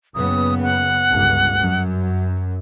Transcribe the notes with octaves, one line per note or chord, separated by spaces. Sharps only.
F#1 C#3 B3 D#6
F#5
G1 C#2
F#2